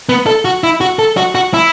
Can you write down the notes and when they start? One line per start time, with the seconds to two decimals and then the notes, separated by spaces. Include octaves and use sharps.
0.09 B3
0.27 A4
0.45 F#4
0.64 E4
0.81 F#4
0.99 A4
1.17 F#4
1.35 F#4
1.54 E4